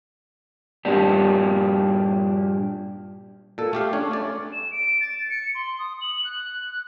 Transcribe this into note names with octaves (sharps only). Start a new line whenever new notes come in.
G2 A#2 A#3 D4 G4
A#2 A4
A3 G4 F5
C#4 D4 C#5
A3 D5
E7
D7
A6
C#7
C6
D#6
F#7
F#6
F#6